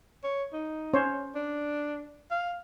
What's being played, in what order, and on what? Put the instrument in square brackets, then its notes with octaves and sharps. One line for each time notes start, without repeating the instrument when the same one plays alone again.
[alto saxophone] C#5
D#4
[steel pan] C#4 C5 C#5
[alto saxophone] D4
F5